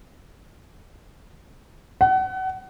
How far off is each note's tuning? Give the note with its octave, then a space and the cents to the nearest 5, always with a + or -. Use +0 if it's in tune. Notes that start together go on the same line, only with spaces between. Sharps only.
F#5 +30